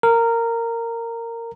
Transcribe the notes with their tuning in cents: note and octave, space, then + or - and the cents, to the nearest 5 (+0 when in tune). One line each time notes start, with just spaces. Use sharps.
A#4 -15